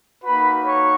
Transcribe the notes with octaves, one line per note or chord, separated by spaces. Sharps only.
A#3 D#4 F#4 B4 B5
C#5 C#6